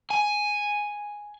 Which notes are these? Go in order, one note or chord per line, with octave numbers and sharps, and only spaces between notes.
G#5